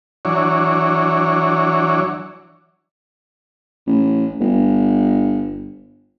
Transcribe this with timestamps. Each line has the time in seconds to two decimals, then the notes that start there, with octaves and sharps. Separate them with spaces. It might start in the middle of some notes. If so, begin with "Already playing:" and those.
0.25 E3 F#3 D4 C#5
3.87 A1
4.40 G1